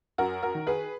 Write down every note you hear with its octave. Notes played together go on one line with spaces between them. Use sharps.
F#2 F#4 A#4
F#4 A#4
D#3
G#4 B4